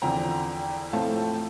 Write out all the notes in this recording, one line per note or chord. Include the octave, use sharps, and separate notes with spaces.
E2 D3 F3 C4 G5 A#5
A2 F3 A3 C4 F5 A5